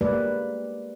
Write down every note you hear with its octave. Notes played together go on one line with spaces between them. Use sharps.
G#3 A#3 G4 B4 D5